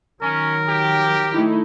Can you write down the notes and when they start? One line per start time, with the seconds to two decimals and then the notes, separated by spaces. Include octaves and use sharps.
0.22 D#3 F#3 C#4 A#4
0.67 G4
1.32 A3 D#4 E4